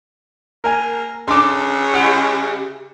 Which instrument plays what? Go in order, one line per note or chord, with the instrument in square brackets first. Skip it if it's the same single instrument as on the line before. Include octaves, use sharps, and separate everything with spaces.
[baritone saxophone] A#3 [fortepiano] A#4 G#5
[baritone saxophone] C#3 [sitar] C#4 D4 A4 [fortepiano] C6 D6
[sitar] G3 E4 G4 [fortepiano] F#5